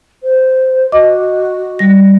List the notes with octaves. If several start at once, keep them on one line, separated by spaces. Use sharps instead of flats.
C5
F#4 D#5 D6
G3 A#6